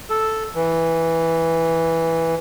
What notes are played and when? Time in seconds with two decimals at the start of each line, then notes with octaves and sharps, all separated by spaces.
0.10 A4
0.55 E3